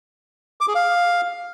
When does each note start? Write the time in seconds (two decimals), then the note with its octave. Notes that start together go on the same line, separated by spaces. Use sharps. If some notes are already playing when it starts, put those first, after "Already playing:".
0.61 D6
0.68 G#4
0.75 F5